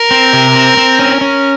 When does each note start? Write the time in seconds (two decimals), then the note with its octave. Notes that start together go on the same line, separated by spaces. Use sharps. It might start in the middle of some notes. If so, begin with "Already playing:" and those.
Already playing: A#4
0.11 C4
0.33 C3
0.55 C4
0.77 C4
0.99 C#4
1.21 C#4